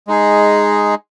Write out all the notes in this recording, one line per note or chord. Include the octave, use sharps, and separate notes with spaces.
G#3 D#4 G#4